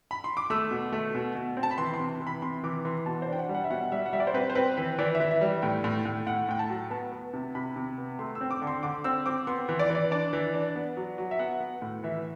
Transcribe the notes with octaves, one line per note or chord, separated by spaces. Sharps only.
B5
C6
D6
A3 E6
B2
A3
B2
B2
C4
A5
B5
E3 C6
C6
C3
E3
B5
C3 C6
E3 D6
E3 C6
B2 A5
C5
D4
G5
F#5
G3
F#5
E5
B2 F#5
G3 E5
F#5
G3 E5
D5
C5
C4 B4
C5
C4 B4
E3 B4
E3 D5
E5
E3
E5
G3
A2 G5
A2
A2
A2 F#5
A2 G5
A5
F#3
B3 A5
B3
C3
C3 B5
C3
B3
A3 C6
E6
C4
D6
D3
C6
D3 D6
C4 E6
C4 D6
B3 C6
E3
D5
E3
D5
D4 D5
E3
D4
B3
F#3
F#3
E5
B3 F#5
B3
A2
E3 E5